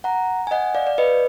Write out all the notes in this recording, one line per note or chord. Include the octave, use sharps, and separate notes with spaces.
F#5 A#5
G#5
D#5 F#5
D5 F5
D5
B4 D#5